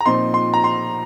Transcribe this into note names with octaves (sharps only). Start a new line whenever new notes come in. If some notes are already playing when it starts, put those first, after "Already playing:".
A#5
A#2 F3 C4 D#4 C6
C6
A#5
C6